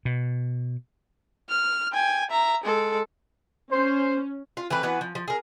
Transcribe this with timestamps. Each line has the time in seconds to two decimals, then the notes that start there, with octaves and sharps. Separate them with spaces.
0.05 B2
1.49 F6
1.93 G5 G#5
2.30 E5 A#5
2.63 G#3 A4
3.71 C#4 C5
4.57 F4
4.70 E3 A3 C4 B4
4.83 E3 B3 F#4 B4
5.01 F3
5.15 F3
5.28 G#4 A#4